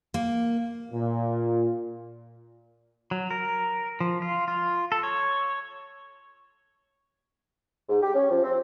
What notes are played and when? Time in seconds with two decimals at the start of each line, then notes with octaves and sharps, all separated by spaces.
0.14 A#3
0.92 A#2
3.11 F#3
3.31 A#4
4.00 F3
4.22 F4
4.48 F4
4.92 A4
5.03 C#5
7.89 G#2
8.02 G4
8.14 C#4
8.30 F3
8.43 C4